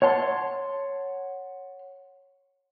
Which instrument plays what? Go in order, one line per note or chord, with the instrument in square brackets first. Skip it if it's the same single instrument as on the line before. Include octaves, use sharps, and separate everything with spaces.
[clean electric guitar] C#5 F#5 A5 C6